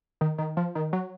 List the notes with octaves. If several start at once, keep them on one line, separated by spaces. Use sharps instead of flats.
D#3
D#3
F3
D#3
F#3